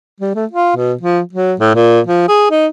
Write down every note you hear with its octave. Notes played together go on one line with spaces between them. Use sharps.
G3
A3
F4
B2
F3
F#3
A2
A#2
F3
G#4
D#4